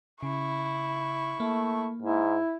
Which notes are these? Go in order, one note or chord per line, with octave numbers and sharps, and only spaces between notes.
C#3 E4 C#6
A3 A#3
G#2 E4